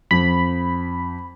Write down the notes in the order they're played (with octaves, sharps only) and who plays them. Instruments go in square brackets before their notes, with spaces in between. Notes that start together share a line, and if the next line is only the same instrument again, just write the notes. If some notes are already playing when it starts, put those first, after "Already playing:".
[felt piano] F2 [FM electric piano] B5